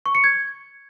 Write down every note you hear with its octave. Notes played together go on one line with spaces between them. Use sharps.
C#6
C#7
G#6